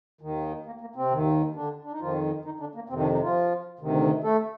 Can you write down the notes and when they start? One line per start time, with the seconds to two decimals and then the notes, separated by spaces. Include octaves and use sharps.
0.21 D#2 D#3
0.66 A#3
0.81 A#3
0.95 C3 C4
1.11 D#2 D#3
1.55 D3 D4
1.84 D4
1.92 D#4
2.00 F2 D#3 F3 F4
2.45 D#3 D#4
2.60 D3 D4
2.75 A#3
2.89 F2 C3 D#3 C4
3.01 D3 D4
3.12 D#3 D#4
3.23 F3 F4
3.79 D2 C3 D#3
4.23 A3 A4